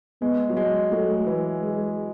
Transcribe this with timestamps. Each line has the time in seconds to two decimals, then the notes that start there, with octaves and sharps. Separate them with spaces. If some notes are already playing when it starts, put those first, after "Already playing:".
0.22 G#3 B3
0.50 F#3
0.57 G#3
0.92 F#3 A3
1.26 E3
1.62 G#3